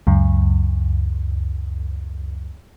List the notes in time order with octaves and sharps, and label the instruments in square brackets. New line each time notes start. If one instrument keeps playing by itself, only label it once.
[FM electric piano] C#2 F#2